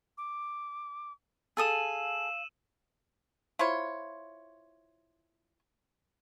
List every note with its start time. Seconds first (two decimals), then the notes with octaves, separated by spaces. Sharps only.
0.18 D6
1.57 G#4 A4 F5 D#6 E6 D#7 E7
3.59 E4 F4 C5 C#5